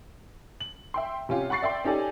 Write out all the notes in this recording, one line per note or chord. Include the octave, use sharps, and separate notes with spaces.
F#7
E5 G5 C6
C3 C#4 F4 G4
F#5 B5 C#6 A6 C7
D5 E5 G5 C6
C#4 D#4 G4 A4 D5 G#5